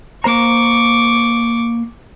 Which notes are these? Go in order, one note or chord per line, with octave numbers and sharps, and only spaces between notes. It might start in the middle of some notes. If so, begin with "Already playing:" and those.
A#3 C5 A#5 C#6 D6